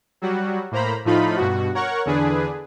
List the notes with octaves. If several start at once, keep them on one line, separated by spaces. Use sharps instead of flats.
F#3 G3 F#4
A2 A#3 C5 A#5 B5
A2 F3 A3 D#4 F4 B5
G2 B2 F#4
A#4 C#5 F#5 C#6
E2 D3 D4 G#4 B4